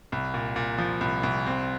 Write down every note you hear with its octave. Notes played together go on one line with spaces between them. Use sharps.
C2
A#2
A#2
F3
C2
C2
C4